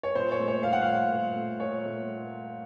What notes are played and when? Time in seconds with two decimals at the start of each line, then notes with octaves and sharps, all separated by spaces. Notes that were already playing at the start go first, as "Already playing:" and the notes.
0.03 C#5
0.15 A#2 C5
0.32 C#5
0.40 A3
0.48 C#5
0.63 A#2 F5
0.73 F#5
0.82 F5
0.87 A3
1.12 A#2
1.36 A3
1.60 A#2 C#5
1.85 A3